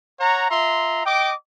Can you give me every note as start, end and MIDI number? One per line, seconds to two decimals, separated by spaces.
0.20 0.49 73
0.20 0.49 78
0.20 0.49 82
0.50 1.02 65
0.50 1.02 76
0.50 1.02 82
0.50 1.02 84
1.06 1.33 75
1.06 1.33 79
1.06 1.33 86